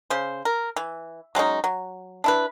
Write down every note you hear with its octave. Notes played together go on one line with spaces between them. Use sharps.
C#3 C5
A#4
E3
F#3 G#3 C#4 D#4
F#3
D4 E4 B4